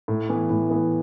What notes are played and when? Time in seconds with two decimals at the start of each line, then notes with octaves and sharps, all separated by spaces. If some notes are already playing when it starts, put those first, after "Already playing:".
0.08 A2
0.29 E3 B3
0.50 A2
0.70 E3 B3